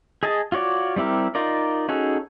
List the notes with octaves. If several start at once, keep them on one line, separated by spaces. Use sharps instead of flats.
G#4 D#5 G#5 A5
F4 F#4 C#5 D5
G3 C4 E4 G4 A#4
D#4 F4 A#4 D5
C#4 D#4 F#4 G#4 A4